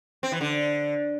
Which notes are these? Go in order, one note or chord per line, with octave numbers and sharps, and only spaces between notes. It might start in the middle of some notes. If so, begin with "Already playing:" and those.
C4
E3
D3